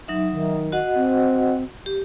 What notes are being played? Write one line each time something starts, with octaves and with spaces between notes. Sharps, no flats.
F#3 D#4 E5
D#3
F#4 D#5 F#5
C4
G4